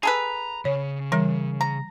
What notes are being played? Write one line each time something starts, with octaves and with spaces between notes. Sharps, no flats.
G#4 A4 B4 A#5
C#3 C#5
E3 G3 A#4
A#5